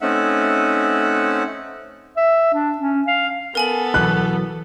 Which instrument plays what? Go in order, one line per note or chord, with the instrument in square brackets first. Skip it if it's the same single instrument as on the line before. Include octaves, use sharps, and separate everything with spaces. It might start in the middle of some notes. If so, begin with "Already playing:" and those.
[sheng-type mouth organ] A3 C4 C#4 D#4 E5 F#5
[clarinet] E5
D4
C#4
F5
[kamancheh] B3 A4 [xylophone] A#4 G#5 F#7
[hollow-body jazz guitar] B2 E3 F#3 [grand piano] F#6